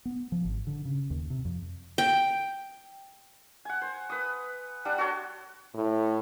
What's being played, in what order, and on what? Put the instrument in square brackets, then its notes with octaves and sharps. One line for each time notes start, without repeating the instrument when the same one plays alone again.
[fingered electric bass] B3
F3
G#1
D3
C#3
D#2
C3
F2
[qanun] G5
[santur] F#5 G#5
C5
B4 D#6
G3 D4 F#5
F#4 A4 C#5 C6
[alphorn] A2